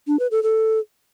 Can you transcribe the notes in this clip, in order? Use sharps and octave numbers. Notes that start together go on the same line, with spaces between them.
D4
B4
A4
A4